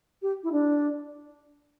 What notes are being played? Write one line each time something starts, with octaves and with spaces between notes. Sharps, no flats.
G4
E4
D4